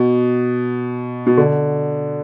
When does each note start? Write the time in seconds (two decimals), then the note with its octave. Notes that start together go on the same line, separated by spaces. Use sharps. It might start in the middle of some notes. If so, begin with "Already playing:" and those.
Already playing: B2
1.27 B2
1.37 D3